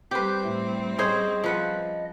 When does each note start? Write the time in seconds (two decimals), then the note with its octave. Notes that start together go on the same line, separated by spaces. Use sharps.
0.11 G3 C4 G4 B4 G6
0.44 A2 A3
0.99 C#4 G#4 C5 D#5
1.44 F3 B4 F#5